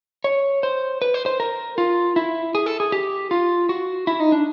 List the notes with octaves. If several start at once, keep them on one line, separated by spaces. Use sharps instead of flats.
C#5
C5
B4
C5
C5
A#4
F4
E4
G#4
A4
G#4
G4
F4
F#4
E4
D#4
D4